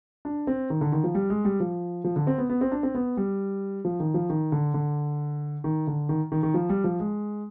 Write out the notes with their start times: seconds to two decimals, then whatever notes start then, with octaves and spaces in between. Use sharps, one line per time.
0.25 D4
0.47 C4
0.70 D#3
0.81 D3
0.92 D#3
1.04 F3
1.15 G3
1.30 G#3
1.45 G3
1.60 F3
2.04 F3
2.16 D3
2.27 C4
2.38 B3
2.50 B3
2.61 C4
2.72 D4
2.83 C4
2.95 B3
3.17 G3
3.85 F3
4.00 D#3
4.14 F3
4.30 D#3
4.52 D3
4.74 D3
5.64 D#3
5.87 D3
6.09 D#3
6.32 D#3
6.43 D#3
6.54 F3
6.69 G3
6.84 F3
7.00 G#3